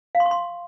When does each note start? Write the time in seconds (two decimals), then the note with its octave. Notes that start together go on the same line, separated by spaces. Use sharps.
0.15 F5
0.20 C6
0.26 C#6
0.31 C6